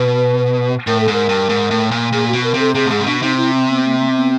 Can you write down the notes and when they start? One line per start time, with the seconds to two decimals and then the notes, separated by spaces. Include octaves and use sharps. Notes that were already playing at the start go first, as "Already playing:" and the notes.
Already playing: B2 B4
0.87 A2 A#4
1.00 A4
1.08 G#2
1.13 A#4
1.29 G2
1.49 G#2
1.71 A2
1.91 A#2
2.12 A#2 G#4
2.28 F#4
2.33 B2
2.44 A#4
2.54 C3
2.59 A4
2.74 C3 G#4
2.86 A2
2.91 G#2 G#4
3.01 C3
3.06 B2 D4
3.21 C3 D#4
3.37 E4
3.53 C4
3.69 B3
3.85 A#3
4.00 A#3
4.10 C4
4.16 B3